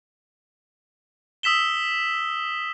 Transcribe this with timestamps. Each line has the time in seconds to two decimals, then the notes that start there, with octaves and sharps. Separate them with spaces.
1.43 D#6 E6 B6 E7 G7